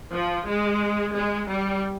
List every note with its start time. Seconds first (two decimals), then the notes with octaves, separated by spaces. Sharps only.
0.12 F3
0.46 G#3
1.14 G#3
1.48 G3